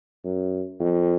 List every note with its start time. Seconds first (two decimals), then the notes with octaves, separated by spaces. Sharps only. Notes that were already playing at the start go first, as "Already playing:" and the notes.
0.24 F#2
0.80 F2